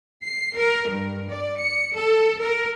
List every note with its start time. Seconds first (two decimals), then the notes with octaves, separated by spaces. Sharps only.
0.24 C7
0.57 A#4
0.88 G2
1.28 D5
1.58 C#7
1.95 A4
2.41 A#4